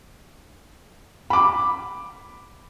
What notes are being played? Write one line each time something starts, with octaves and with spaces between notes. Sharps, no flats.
B5 D6